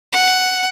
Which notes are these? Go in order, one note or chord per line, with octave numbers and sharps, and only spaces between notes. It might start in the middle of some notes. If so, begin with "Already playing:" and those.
F#5